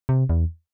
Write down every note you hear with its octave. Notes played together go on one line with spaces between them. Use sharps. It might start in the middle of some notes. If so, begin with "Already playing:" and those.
C3
E2